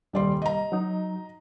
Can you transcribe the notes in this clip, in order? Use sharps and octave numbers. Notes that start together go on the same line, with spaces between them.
D#1 C2 G3 D5 C6
D#5 A#5
F#3 D#4